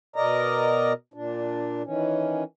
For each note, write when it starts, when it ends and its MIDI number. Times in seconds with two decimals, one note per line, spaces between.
0.16 0.93 47
0.16 0.93 70
0.16 0.93 74
0.16 0.93 75
0.16 0.93 82
1.14 1.83 46
1.14 1.83 62
1.84 2.44 51
1.84 2.44 52
1.84 2.44 61